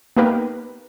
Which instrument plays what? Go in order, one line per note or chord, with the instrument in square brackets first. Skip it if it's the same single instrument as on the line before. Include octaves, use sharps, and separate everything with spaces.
[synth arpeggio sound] A#3 B3 D#4 G4 A#4 B4